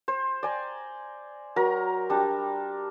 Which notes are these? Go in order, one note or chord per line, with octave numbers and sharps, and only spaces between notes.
C5
D5 G#5 A#5
F#3 A#4 A#5
G3 D4